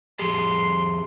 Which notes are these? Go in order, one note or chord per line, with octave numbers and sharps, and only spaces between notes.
F2 G4 G#4 C6